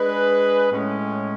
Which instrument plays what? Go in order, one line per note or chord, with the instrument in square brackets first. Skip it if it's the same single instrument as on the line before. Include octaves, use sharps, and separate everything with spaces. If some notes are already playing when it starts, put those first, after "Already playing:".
Already playing: [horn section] G#3 D4 G#4 B4
A2 G#3 C#4